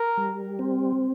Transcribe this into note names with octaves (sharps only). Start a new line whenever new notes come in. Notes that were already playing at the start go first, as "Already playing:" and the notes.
Already playing: A#4
G3
C4